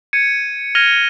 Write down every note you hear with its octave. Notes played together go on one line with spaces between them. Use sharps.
G#6 C#7 D#7
F6 G#6 A#6 D#7 F7 G7